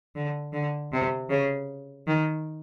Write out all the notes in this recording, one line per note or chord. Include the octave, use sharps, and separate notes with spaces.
D3
D3
C3
C#3
D#3